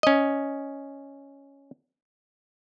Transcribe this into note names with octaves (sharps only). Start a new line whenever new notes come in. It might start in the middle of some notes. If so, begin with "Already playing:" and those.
C#4 D#5